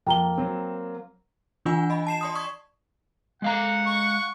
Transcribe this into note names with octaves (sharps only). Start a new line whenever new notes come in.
F2 A#3 G5 A#5 G7
F#3 C4
E3 D4 F4 F#5 G#5
D#5 B5
A5 C7 E7
D5 C6 D#6
C#6 D#6 G#6
G#3 F5 F#5 A#5
C#6